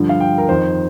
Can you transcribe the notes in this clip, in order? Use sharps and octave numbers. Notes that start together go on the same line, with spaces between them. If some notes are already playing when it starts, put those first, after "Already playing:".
Already playing: G2 D3 F3
F5
G5
A#4
F2 D#3 C5